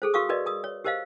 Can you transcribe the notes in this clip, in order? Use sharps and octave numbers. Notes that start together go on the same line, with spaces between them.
G#4 A4 C5
F#4 A#4 F5 C#6 D#6
F#4 A#4 B4 D5 D#5
A#4 D#6
C#5
G4 A#4 C5 D#5 F5